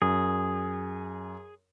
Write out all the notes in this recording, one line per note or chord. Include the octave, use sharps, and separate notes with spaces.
F#2 G#4